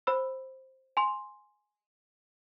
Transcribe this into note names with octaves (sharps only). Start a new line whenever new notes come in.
C5 B5 E6
G#5 C6